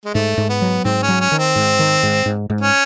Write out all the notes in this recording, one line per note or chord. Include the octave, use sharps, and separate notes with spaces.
G#3
G#2 A3
G#2
B3
F#3
G#2 C4
C#4
F#3
C#4
D#3
C4
G#2
D#3
G#2
G#2
G#2
C#4